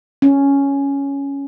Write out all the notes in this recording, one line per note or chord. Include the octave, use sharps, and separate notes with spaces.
C#4